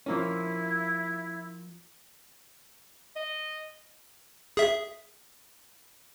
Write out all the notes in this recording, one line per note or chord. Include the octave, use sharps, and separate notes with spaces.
F3 A#3 C#4 E4
D#5
G#4 E5